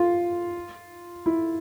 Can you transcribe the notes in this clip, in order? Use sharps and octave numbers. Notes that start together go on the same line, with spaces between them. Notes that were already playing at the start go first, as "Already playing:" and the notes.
Already playing: F4
E4